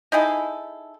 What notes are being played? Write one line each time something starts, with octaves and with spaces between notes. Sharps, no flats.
D#4 E4 G#4 A4